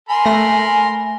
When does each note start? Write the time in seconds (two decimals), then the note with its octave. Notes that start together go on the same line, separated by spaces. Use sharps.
0.09 A#4 G#5 B5 C6
0.25 A3 A#6